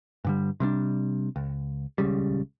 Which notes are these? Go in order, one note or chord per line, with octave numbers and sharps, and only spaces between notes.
G2 D3 G3
C3 G3 A3 D4
C#2
D#1 C#2 C#3 G3